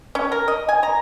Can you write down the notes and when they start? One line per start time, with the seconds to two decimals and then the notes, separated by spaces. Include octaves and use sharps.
0.15 C#4
0.32 A#4
0.48 D#5
0.68 G#5
0.83 A#5